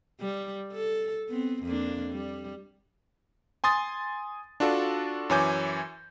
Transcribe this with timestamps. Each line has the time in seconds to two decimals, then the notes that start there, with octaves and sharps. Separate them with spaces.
0.20 G3
0.72 A4
1.30 B3 C4
1.64 F2 A#3 D4
2.12 G3
3.64 G#5 C6 D#6 A6
4.60 D4 F4 F#4 A4 D5
5.30 F#2 E3 C#5 G#5 D6 G6